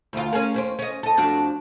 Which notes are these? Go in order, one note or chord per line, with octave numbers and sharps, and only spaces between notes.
D2 F4
C#4 G#4 A#4
D#2 C4 C#4
C#4 D#5
A4 D#5
F2 D4 F#4